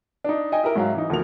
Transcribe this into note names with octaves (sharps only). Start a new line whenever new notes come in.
D4 D#4
D#5 G5 G#5
E4 G4 A#4
G#2 F#3 E5 F5
E3 D#4
D2 F3 A#3 F7